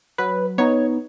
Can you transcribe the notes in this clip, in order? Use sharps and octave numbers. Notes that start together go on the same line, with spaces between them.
F#3 B4
B3 D#4 C#5